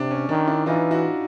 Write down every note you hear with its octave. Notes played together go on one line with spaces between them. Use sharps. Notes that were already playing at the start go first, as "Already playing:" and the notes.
Already playing: C3 D4
C#4
D#3 D4
D4 E4
E3 D#4 F4
E4 F#4